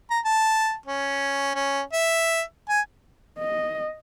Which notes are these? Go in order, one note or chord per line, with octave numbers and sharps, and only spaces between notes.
A#5
A5
C#4
C#4
E5
G#5
D#5